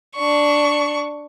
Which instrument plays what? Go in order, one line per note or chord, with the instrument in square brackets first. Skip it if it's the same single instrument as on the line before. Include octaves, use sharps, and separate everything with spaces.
[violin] D4 C#6